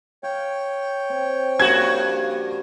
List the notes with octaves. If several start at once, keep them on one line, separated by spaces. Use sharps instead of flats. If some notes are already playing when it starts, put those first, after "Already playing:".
C#5 F5 G5
C4
G2 C#3 F3 A#3 F#4 G#5 G#6